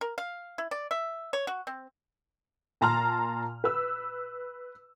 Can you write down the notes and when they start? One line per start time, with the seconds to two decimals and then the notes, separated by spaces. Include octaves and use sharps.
0.01 A#4
0.18 F5
0.58 E4
0.71 D5
0.91 E5
1.33 C#5
1.47 F#4
1.67 C4
2.81 A#2 A5 A#5 C6 F6
3.64 B4 E6